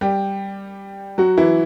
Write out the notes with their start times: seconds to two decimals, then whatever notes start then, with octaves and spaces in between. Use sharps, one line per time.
0.01 G3 G4
1.18 F#3 F#4
1.38 E3 E4